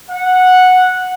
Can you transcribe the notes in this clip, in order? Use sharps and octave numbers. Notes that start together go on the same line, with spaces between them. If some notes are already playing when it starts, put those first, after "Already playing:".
F#5